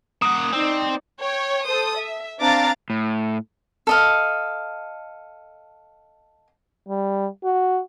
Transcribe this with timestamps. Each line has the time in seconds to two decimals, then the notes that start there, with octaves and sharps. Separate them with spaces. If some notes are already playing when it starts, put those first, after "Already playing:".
0.22 A#3 F#5 D#6
0.53 C4 D#4 D5
1.19 C#5 G5
1.66 A4 C5 D#6
1.97 E5
2.40 C4 D4 F5 A#5 D6 A6
2.90 A2
3.87 A4 D#5 F5
6.88 G3
7.44 F#4